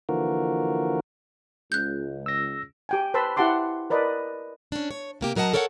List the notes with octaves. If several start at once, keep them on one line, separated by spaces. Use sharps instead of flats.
D3 E3 F3 A#3 F#4 A#4
C#2 F#6 G6
E6 A#6
G4 G5 G#5
B4 C5 A5 B5 C6 E6
E4 G4 F#5 A5 C6 D6
A#4 B4 D5 D#5
C#4 D4
C#5
C3 A#3 G4
F#2 F#3 A#4 D#5 F#5 A5
A4 A#4 C#5 D5 F5 F#5